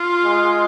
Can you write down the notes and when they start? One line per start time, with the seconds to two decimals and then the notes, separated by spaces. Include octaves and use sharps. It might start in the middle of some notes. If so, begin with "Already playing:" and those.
Already playing: F4
0.25 G#3